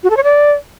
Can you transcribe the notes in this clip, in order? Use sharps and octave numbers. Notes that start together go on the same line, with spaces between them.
F#4
A4
C#5
D5